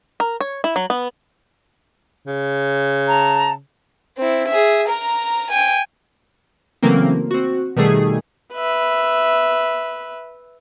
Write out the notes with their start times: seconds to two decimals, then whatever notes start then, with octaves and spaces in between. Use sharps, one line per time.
0.20 A#4
0.40 C#5
0.64 E4
0.76 F#3
0.90 B3
2.27 C#3
3.09 A5 A#5
4.17 C4 E4
4.48 G#4 E5
4.88 A#4 A#5
5.51 G5 G#5
6.83 C#3 E3 F#3 A3 A#3 C4
7.31 C4 F#4
7.76 B2 D#3 G3 A3 G#4
8.54 B4 E5